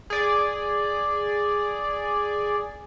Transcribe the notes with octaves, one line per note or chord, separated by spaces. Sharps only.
G#4 D5